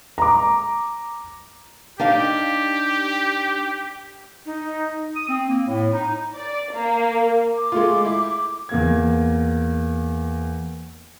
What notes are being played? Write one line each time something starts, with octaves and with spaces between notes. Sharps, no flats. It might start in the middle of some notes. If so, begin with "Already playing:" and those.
A#5 D6
D4 D#4 G4 F5
D#4
D#6
C4
A#3
A2
D#4
D5
A#3
D6
G#3 A3 F4
E4
E2 A#3 G#6